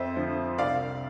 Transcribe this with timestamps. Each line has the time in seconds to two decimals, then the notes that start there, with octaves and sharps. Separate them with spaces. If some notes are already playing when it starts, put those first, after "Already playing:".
Already playing: F2 C5 E5
0.16 D3 F3
0.58 C2 D5 F5